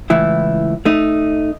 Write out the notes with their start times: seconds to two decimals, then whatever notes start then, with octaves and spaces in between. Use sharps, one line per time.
0.10 C#2 A2 E3 E4
0.85 A3 D#4